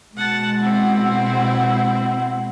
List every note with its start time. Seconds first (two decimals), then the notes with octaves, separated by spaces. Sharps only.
0.17 B2 G#3 F#5 A5
0.61 C4 E4 F#5